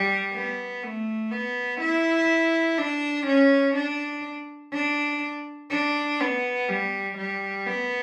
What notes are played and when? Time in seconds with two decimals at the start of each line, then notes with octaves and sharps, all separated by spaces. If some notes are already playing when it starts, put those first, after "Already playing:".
Already playing: G3
0.33 B3
0.83 A3
1.32 B3
1.80 E4
2.78 D4
3.26 C#4
3.75 D4
4.73 D4
5.71 D4
6.20 B3
6.69 G3
7.17 G3
7.66 B3